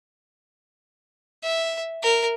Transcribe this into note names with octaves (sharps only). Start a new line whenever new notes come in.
E5
A#4